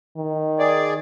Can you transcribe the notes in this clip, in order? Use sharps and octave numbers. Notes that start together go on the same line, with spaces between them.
D#3
G#4 D5